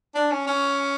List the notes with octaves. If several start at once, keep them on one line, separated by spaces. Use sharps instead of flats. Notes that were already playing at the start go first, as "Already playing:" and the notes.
D4
C#4
C#4